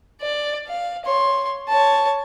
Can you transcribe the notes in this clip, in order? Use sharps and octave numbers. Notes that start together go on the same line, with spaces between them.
D5
F5
C#5 C6
C#5 A5